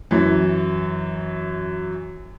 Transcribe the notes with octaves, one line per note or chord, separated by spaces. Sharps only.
F#2 E3